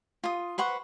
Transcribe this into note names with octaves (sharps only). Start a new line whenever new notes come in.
F4 D#6
B4 C5 F#5 C#6